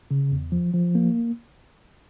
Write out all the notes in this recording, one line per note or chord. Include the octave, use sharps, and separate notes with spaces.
C#3
E2
F3
F3
A#3